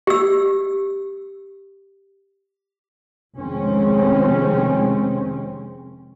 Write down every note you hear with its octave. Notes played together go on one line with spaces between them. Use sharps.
G4 E6
F1 D#3 G#3 C4 C#4